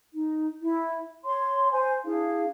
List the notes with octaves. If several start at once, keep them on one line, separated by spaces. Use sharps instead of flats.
D#4
E4
C#5 C6
C5 G#5
D4 E4 G#4 F5